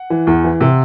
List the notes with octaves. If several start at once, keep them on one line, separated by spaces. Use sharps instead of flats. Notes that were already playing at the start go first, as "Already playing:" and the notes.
Already playing: F#5
E3
E2
E3
C3